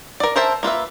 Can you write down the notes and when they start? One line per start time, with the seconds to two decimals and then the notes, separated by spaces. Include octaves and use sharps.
0.20 A#4 D5
0.36 A#4 C5 E5 A5
0.63 A#3 F4 B4 E5